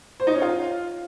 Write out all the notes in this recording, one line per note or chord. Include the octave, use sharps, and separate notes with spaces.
C5
D#4
C#4
F4